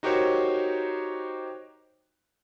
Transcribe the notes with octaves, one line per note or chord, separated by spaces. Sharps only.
D#4 F#4 G4 A#4 C5 C#5